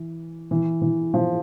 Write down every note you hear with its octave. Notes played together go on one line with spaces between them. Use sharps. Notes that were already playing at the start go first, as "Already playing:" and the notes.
Already playing: E3
E3
E3
F3